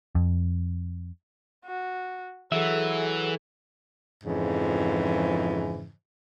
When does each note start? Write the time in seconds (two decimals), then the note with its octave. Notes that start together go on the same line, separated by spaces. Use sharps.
0.15 F2
1.65 F#4
2.52 E3 F#3 G#4 A4 E5
4.24 F2 G#2 C#3 E3 F3